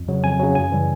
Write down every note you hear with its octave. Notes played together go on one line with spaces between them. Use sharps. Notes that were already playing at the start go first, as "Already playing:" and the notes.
Already playing: F2
C#3 F#3
F2 G#5
C#3 F#3
F#2 G#5
C#3 E3 G3